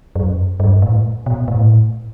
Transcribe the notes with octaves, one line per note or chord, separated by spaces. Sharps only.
F#2
G2
A2
B2
A2